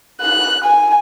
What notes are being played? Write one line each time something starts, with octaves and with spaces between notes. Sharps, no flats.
F#6
G#5